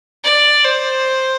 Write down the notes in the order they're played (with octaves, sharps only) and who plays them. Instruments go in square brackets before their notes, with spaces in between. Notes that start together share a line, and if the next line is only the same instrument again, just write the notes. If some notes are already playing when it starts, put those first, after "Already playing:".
[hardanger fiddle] D5
C5